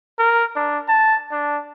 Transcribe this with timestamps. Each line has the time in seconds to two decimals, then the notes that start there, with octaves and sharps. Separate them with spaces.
0.19 A#4
0.56 D4
0.88 A5
1.31 D4